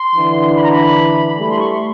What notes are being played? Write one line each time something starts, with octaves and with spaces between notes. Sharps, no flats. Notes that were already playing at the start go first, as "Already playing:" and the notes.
Already playing: C6
D3 E3
B5
A#5
B5
G3 A3 B5
C6
C#6
C6